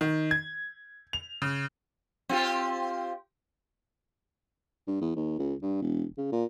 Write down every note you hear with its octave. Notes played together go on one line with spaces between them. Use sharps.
D#3
G#6
F7
C#3
C4 F4 G4
G2
E2
D#2
C#2
G2
E1
C#3
A#2